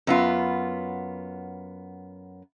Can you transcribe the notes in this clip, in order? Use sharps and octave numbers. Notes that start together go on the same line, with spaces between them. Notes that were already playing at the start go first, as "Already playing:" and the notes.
F#2 B3 F4